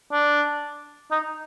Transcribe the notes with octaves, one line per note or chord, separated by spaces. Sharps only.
D4
D#4